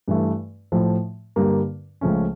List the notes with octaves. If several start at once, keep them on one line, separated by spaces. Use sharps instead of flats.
G2 E3 A3
A2 F3 A3
G2 D3 G3 A#3
C#2 C#3 F3 A3 C#4